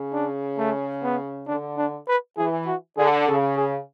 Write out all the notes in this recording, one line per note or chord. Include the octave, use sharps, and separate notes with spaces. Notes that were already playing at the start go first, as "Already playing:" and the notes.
Already playing: C#3
D4
A3
B3
D3 D4
D4
B4
E3 G#4
F#4
D3 G#4
C#3 A4
G#4